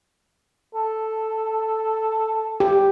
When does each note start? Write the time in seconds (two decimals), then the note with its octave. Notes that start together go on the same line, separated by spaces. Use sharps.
0.75 A4
2.60 G4